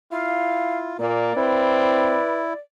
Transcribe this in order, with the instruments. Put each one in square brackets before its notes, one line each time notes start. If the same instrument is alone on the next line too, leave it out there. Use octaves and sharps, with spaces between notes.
[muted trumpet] E4 [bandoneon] F4 [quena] F5
[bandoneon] A#2 [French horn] A#3 [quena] D5
[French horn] C4 [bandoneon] E4 [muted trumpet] B4